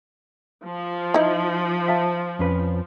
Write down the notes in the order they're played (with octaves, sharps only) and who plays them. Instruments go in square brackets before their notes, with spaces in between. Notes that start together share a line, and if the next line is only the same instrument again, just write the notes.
[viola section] F3
[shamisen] D#4 E4
[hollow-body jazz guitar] E5 F5 A5
F2 C#4 B4